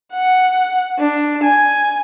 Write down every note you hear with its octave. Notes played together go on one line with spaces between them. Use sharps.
F#5
D4
G#5